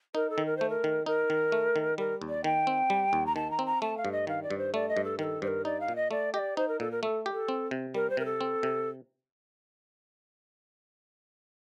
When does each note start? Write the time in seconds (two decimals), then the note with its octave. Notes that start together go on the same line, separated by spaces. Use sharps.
0.15 D#4 A#4
0.30 A4
0.38 D#3
0.46 A#4
0.57 A3 C5
0.70 A#4
0.84 D#3
1.06 D#4 A#4
1.30 D#3
1.52 A3
1.76 D#3
1.98 G3 A#4
2.22 D#2
2.29 D5
2.44 D#3 G5
2.67 C4
2.90 G3
3.13 D#2
3.26 A#5
3.35 D#3 A5
3.51 A#5
3.59 C4
3.66 A#5
3.82 A3 A5
3.97 F5
4.05 G2
4.12 D#5
4.27 D#3 F5
4.43 D5
4.51 G2
4.58 C5
4.74 A3 D5
4.89 D#5
4.97 G2
5.04 A4
5.19 D#3 A#4
5.23 A4
5.42 G2 C5
5.47 A#4
5.65 D#4 D5
5.80 F5
5.88 A#2
5.96 D#5
6.11 A3 D5
6.34 G4 D#5
6.39 D5
6.57 D#4 C5
6.68 A#4
6.80 A#2 A4
6.91 A#4
7.03 A3 A4
7.26 G4
7.33 A4
7.48 C4
7.71 C3
7.94 G3 A#4
8.10 C5
8.17 C3 A#4
8.25 A4
8.41 C4
8.63 C3